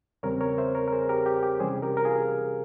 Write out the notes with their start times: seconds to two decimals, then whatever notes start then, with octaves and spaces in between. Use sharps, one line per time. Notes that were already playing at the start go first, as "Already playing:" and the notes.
0.23 E2 C#3 G3 C4 A#4 C#5
0.41 A#4 C#5
0.58 C5 E5
0.75 A#4 C#5
0.88 A#4
0.92 G#4 C5
1.09 G4 A#4
1.26 G4
1.43 G4
1.60 C3 E3 G3 C#4 G#4 C5
1.83 G4 A#4
1.97 A#4
2.05 F4 G#4